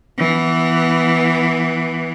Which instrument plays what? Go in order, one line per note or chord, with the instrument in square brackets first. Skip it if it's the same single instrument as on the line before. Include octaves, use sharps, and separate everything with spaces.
[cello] E3 B3